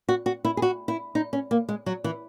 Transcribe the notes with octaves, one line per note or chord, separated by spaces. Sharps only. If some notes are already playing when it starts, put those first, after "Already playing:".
F#4
F#4
E4
G#4
F#4
E4
D#4
C#4
A#3
G#3
F#3
E3